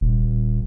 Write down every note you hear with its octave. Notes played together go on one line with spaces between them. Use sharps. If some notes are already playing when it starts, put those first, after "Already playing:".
D#1